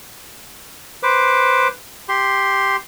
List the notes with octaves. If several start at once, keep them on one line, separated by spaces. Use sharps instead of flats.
B4 C5 D6
G4 C6